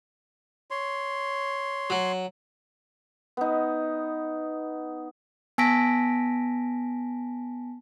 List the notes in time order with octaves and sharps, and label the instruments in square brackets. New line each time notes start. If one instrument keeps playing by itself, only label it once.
[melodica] C#5 C6
[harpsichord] F#3
[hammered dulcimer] B3 D#4
[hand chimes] B3 G#5 A5 A#6 B6 D7